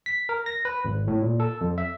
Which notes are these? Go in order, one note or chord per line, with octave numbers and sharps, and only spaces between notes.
B6
A#4
A#6
B4
G#1
A2
A#2
A4
F2
E5